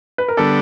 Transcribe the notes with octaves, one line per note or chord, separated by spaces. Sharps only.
B4
A#4
D3 G3 B3 D4 A4